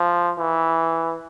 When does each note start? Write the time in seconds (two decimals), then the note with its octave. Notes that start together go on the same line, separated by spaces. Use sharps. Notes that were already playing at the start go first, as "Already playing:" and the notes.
Already playing: F3
0.39 E3